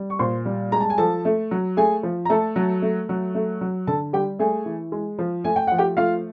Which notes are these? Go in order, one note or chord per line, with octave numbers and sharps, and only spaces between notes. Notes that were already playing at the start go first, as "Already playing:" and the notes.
Already playing: G3
C#6
A#2 C5 C6
G3
G#3 A#5
A5
G#5
F3 A4 A5
A3
F#3
A3 G#4 G#5
F3
A#5
A3 A4 A5
F#3
A3
F#3
A3
F#3
D3 A4 A5
G3 G4 G5
A3 G#4 G#5
E3
G#3
F3
A3 G#5
G5
F3 F#5
G4 G5
A3 F4 F5